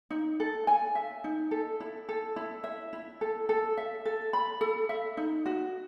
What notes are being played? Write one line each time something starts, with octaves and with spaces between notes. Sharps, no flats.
D#4
A4
G#5
E5
D#4
A4
E4
A4
E4
E5
E4
A4
A4
E5
A4
B5
A4
E5
D#4
F#4